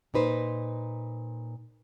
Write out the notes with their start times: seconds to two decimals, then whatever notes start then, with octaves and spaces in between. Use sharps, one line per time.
0.14 A#2 D#4 B4 C5